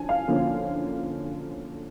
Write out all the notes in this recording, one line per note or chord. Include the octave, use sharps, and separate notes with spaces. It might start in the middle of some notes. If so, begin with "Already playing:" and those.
Already playing: D3 F3 C#4 G#5 A5
F5
D3 F3 A#3 C#4